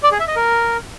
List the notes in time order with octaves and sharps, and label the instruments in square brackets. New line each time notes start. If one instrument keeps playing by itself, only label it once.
[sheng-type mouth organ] D5
G#4
E5
D#5
A#4